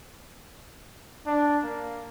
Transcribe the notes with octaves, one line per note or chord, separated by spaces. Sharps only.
D4
A#3